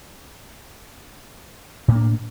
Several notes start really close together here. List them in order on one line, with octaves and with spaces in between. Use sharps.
A2 A#3 D4